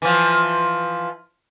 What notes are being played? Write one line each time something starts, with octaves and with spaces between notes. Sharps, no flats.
E3 F3